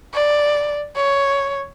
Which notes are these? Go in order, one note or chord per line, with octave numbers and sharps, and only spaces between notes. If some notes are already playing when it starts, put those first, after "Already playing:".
D5
C#5